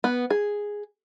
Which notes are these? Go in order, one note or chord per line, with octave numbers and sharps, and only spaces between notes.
B3
G#4